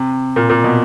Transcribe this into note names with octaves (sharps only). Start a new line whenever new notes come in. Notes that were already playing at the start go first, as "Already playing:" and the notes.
Already playing: C3
A#2
A#2
B2